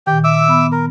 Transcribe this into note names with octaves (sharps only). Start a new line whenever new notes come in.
A#2 D#3 G4 G5
E5 D6 E6
B3 B5
A#4